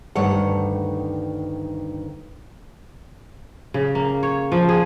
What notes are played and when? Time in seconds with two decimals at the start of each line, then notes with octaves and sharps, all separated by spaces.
0.15 D2 G2 D#3 C#5 F#5
3.74 C#3
3.95 A#3
4.23 C#5
4.52 F3
4.69 G#4